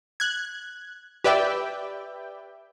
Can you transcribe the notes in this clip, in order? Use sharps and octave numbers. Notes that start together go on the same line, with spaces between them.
F#6 G#6
G4 B4 D5 E5 G5